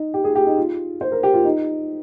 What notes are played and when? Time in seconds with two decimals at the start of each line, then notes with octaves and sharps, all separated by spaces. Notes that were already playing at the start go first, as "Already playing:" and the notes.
Already playing: D#4
0.14 G4
0.24 G#4
0.35 G4
0.46 D#4
0.57 F4
1.01 C5
1.12 A#4
1.23 G4
1.34 F4
1.45 D#4